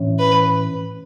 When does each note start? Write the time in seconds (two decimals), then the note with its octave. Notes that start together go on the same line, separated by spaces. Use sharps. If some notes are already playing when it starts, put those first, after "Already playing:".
Already playing: A2 E3 C#4
0.19 B4